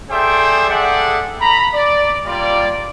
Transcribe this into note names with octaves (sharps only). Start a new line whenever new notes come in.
G#4 A4 C5 D5 E5 G5
G#4 A4 D5 E5 F#5 G5
A#5 B5
D5
G3 A#3 F4 D5